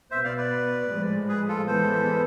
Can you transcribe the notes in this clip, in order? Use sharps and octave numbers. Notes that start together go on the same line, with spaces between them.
B2 B3 C5 E5
D5 F5
B4 D5
A2 F3 G#3
G#4 B4
F4 A4
E3 G#3 B3 A4 C5